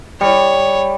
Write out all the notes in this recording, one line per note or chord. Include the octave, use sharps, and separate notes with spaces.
G3 C#5